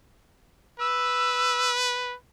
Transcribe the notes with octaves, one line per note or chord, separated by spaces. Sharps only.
B4 E6